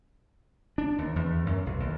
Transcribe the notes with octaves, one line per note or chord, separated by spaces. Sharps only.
D4
D#2
E2
F#2
B1
D#2